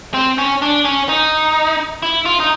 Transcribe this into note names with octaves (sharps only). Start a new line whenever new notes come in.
C4
C#4
D4
C#4
D#4
E4
F4
D#4